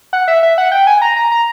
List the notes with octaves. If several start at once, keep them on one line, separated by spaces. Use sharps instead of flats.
F#5
E5
E5
F#5
G5
G#5
A#5
A#5
A#5